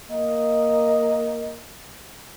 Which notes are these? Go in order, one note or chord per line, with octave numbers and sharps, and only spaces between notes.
A#3 D#5